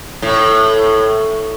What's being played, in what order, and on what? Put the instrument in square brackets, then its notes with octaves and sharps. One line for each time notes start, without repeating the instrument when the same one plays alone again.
[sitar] A2